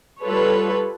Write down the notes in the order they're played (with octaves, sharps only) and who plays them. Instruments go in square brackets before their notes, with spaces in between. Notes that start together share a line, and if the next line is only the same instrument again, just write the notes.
[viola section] G3 F4 A4 B4 C#5